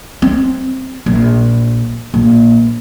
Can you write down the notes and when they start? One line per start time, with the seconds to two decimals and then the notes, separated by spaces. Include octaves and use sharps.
0.22 C4
1.06 A#1
2.14 A#1